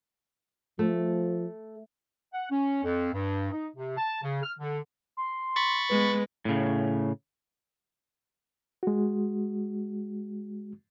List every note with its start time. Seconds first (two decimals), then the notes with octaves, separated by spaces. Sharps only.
0.79 F3 A3
2.33 F#5
2.50 C#4
2.84 F2
3.13 G2
3.52 D#4
3.75 C3
3.97 A5
4.23 C#3
4.43 F6
4.58 D3
5.17 C6
5.56 B5 C#6 A6
5.89 G#3 B3 B4
6.45 A2 C#3
8.83 G#3 F#4